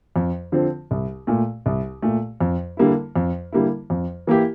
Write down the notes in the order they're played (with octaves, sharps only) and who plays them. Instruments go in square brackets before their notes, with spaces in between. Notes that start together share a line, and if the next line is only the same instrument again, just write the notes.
[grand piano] F2
D3 F3 C4
C2
A#2 A3
C2
A#2 A3
F2
D3 G3 A#3 E4
F2
D3 G3 A#3 E4
F2
E3 A#3 E4 G4